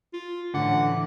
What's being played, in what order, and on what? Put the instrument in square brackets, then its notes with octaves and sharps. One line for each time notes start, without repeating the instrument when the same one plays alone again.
[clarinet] F4
[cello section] A2 E3 C#4 [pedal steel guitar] D3 [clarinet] F#5 [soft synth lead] D6